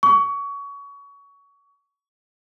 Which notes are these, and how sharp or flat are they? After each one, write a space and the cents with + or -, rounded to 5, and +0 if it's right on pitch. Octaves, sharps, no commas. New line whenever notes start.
C#6 +25